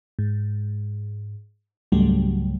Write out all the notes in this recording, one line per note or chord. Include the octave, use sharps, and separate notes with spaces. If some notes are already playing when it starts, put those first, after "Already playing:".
G#2
C#2 G#2 C#3 F#3 G3 A3